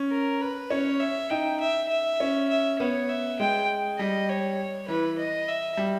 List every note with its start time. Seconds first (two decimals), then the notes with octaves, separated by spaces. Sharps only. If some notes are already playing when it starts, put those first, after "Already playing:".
Already playing: C#4
0.11 A#4
0.41 B4
0.70 C#4 C#5
1.00 E5
1.30 D#4 G5
1.61 E5
1.90 E5
2.20 C#4
2.49 E5
2.79 B3 C#5
3.09 E5
3.40 G#3 G5
3.99 G3 D#5
4.29 C#5
4.88 E3 B4
5.18 D#5
5.48 E5
5.77 G3